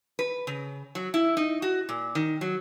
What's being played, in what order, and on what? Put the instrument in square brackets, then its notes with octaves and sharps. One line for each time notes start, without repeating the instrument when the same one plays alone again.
[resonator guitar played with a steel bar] B4
C#3
F#3
E4
D#4
F#4
A#2
D#3
F#3